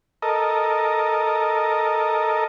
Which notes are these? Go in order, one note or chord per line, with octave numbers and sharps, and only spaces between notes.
A4 A#4 D#5